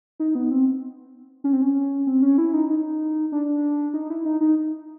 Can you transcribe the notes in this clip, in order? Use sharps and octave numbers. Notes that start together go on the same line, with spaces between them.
D#4
B3
C4
C#4
C4
C#4
C4
C#4
E4
D#4
D#4
D4
D#4
E4
D#4
D#4